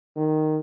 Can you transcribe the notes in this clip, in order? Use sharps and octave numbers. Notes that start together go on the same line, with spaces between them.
D#3